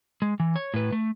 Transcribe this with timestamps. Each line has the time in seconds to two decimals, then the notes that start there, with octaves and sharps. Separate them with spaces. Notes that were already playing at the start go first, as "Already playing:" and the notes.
0.22 G#3
0.40 E3
0.56 C#5
0.74 A2 B4
0.92 A3